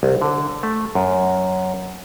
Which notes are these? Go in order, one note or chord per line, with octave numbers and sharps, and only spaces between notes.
C2
D3
A3
F#2